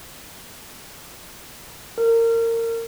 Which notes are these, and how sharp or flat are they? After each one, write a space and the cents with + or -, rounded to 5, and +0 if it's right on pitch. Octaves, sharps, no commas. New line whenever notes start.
A#4 -25